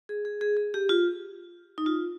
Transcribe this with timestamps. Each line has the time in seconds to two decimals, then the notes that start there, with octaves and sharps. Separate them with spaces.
0.09 G#4
0.25 G#4
0.41 G#4
0.57 G#4
0.74 G4
0.89 F4
1.78 D#4
1.86 F4